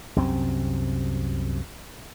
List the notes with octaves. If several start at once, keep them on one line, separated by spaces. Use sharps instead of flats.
C2 F#2 C3 C4